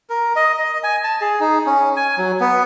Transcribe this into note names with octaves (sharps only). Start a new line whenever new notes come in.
A#4
D#5
D#5
G#5
A5
G#4
D#4
C#4
G#5
F#3
B3